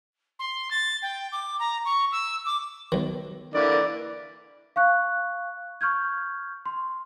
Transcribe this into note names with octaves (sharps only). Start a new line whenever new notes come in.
C6
A6
G5
D6
A#5
C#6
E6
D6
B1 D#3
D3 E3 A#3 D5
F5 C#6 F#6
C#6 F6 G6 G#6
C6